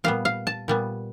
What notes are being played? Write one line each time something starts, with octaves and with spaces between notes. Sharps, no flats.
A#2 G3 B3 F5
F5
A5
A#2 G3 B3